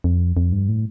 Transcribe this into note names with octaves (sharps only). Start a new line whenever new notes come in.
F2
F2
G2
A2